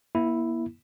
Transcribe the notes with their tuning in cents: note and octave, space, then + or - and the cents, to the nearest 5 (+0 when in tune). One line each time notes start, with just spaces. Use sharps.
A#3 +40 E4 +0